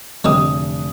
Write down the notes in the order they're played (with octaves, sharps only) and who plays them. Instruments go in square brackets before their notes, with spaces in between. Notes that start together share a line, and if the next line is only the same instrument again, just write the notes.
[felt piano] F1 D3 D#6 [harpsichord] G#3 C4 G4